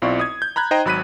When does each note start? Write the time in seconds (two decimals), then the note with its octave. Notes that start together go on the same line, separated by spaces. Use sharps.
0.02 B1 C4 E4 F4 D5 C#6
0.20 D#6 G#6
0.42 G6
0.56 A#5 B5 F#6 G#6
0.71 D#4 C5 D#5 G5 A#5
0.85 G#1 F#3 B5 F#6 B6 D#7